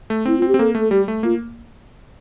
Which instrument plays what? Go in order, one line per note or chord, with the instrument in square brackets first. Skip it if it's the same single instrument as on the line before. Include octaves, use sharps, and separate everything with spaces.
[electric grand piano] A3
[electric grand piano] C4 [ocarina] E4
[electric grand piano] C4 [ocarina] F4
[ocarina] G4
[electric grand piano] C4
[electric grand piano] A#3 [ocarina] A4
[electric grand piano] A3
[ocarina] A4
[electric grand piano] G3 [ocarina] G4
[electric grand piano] A3
[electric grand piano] A#3 [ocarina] F4